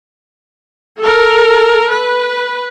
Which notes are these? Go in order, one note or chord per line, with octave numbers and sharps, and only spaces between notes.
A4 A#4
B4